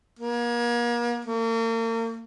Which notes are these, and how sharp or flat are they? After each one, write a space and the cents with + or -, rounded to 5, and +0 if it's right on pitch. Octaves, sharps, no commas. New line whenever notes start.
A#3 +35
A#3 -40